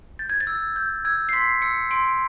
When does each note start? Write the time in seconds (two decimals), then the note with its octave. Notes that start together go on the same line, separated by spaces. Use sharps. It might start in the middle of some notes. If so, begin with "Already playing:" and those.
0.19 G6 A6
0.30 G#6
0.41 A6
0.47 E6
0.76 G6
1.05 E6 G#6
1.29 C7
1.33 C6 B6
1.62 E6 C#7
1.91 C6 D7